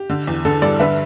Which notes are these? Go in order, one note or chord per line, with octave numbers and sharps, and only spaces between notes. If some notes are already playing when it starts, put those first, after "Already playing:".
Already playing: G4
D3
E2
D3 A4
G2 A4 D5
D3 B4 E5